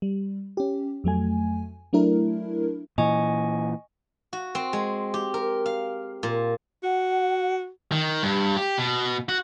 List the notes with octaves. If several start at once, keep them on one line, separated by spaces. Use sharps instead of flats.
G3
C#4 G4
F2 F#3 A3 G#5
F#3 A3 D4 E4 A#4
A#2 E3 D#5 G#5 C#6
F#4
C4
G#3
G4
A#4
F5
A#2
F#4 F#5
D#3
G2
G4
B2
F#4